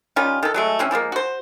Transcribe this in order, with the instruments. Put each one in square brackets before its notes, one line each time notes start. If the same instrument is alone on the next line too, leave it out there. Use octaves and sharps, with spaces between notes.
[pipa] D#3 G3 C#4 F4
D#3 A4
F#3 G#3 A3
E3 C4 C#4
E3 F3 G#3 A#3
F#4 C5